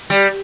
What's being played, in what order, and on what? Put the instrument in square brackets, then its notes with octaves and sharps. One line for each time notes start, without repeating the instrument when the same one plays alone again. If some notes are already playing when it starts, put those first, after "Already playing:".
[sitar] G3